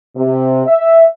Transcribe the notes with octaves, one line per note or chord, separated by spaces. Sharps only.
C3
E5